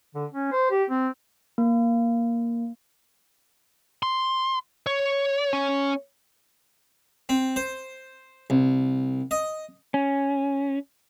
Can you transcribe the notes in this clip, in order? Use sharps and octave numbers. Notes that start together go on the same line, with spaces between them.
D3
C#4
C5
G4
C4
A#3
C6
C#5
C#4
C4
C5
C2
D#5
C#4